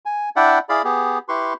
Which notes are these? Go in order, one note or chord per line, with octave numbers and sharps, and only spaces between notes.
G#5
D4 E4 D5 E5 F#5 G5
E4 G#4 D5 F5 B5
B3 G4 G#4
E4 G4 B4 C6 C#6